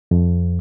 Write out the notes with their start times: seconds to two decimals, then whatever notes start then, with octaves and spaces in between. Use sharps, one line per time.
0.11 F2